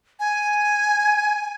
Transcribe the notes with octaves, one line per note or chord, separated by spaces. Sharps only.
G#5